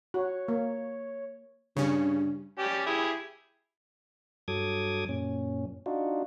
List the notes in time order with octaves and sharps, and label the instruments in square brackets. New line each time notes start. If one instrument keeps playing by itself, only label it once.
[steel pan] F#4 [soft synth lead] C#5
[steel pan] A#3
[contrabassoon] G2 [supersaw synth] C#3 C#4
[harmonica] C#4 G4 D5
E4 G4 G#4
[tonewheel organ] G2 F#3 A4 D6 D#6 G#6
F#2 A#2 C#4
D4 D#4 F4 F#4